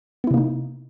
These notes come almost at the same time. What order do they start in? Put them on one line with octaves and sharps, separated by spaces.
B3 E4 C3 A#3 D#4